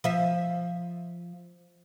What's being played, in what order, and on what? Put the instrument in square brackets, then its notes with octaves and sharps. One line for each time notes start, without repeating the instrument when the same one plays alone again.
[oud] F3 E5